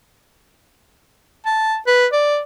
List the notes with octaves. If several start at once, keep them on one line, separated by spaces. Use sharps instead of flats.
A5
B4
D5